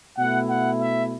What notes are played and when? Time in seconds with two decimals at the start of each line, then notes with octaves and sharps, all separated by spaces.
0.17 B2 A3 E4 F#5
0.49 F#5
0.80 E5